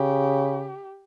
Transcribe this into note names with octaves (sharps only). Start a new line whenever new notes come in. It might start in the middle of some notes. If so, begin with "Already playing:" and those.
Already playing: C#3 G4